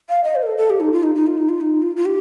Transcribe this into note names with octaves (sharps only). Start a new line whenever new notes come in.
F5
D#5
C5
A#4
A4
A4
G4
D#4
F4
D#4
D#4
F4
D#4
F4
D#4
F4
F4
G4